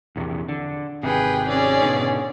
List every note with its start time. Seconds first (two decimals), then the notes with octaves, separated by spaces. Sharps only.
0.16 A#1 E2 C3
0.49 D3
1.03 G#1 C3 G#4 B4 G5
1.48 C#4 G#4 D5
1.82 G#2 B2 D3